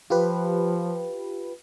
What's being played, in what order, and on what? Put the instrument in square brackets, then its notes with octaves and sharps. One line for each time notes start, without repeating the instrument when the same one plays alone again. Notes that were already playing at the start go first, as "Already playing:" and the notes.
[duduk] F3 [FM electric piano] F4 G4 B4